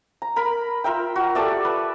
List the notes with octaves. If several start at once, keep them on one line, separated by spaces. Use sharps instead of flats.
A#5
A#4 B5
F4 A#4 E5 G5
F#4
G4 A4 D5 E5
B4